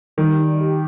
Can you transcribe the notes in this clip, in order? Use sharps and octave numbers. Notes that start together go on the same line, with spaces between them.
D#3 G3
D#4
G4